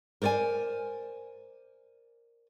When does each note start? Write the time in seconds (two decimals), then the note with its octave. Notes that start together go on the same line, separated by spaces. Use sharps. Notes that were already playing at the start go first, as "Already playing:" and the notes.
0.22 A#4 C5 D5 E5 G#5